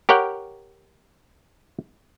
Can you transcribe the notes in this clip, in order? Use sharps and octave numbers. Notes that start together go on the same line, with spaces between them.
G4 A#4 C#5 F#5 G5